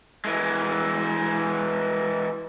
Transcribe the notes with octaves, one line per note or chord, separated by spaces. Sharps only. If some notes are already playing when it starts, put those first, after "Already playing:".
E3 G#3